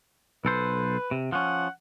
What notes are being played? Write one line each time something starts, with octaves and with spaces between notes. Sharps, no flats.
B1 A4 B4 C5
C3
F3 C#4 F#5